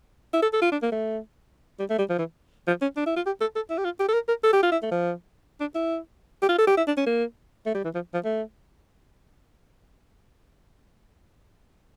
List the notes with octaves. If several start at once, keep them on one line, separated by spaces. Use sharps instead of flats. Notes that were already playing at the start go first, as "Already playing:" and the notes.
E4
A4
A4
F4
D4
A#3
A3
G3
A3
G3
F3
E3
F3
C#4
D4
E4
F4
G4
A4
A4
E4
G4
F4
G4
A4
A#4
A#4
A4
G4
F4
E4
A3
F3
D4
E4
G4
F4
A4
G4
E4
D4
C#4
A#3
A3
G3
E3
F3
F3
A3